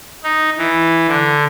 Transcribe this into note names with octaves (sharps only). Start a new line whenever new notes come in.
D#4
E3
D3